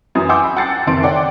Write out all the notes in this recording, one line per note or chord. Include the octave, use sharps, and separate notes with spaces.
F#2 E3 D#6
F#5 G#5 C6 D6 E6 G6
B5
F#5 G5 A5 A6 C7 C#7
F#1 C3 D#3 A5 C6 D7
C#5 D5 F#5 G5